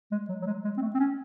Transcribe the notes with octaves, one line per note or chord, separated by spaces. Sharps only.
G#3
F#3
F#3
G#3
G#3
C4
A3
C4
C#4